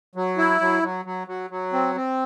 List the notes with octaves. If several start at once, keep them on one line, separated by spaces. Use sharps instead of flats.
F#3
E4
F#3
F#3
F#3
F#3
F#3
C4
C4